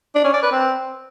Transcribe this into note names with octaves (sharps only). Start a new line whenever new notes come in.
D4
C#4
D5
B4
C4